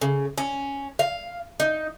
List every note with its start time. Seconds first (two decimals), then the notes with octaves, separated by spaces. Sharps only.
0.02 C#3
0.38 C#4
0.99 F5
1.60 D#4